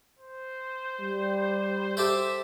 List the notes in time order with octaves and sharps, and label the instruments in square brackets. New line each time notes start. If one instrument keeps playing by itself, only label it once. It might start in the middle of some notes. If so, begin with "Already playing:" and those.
[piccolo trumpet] C5
[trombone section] G3
[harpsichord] G4 A4 C5 [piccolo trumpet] E5